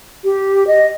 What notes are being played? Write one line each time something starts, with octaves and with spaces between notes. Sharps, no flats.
G4
D#5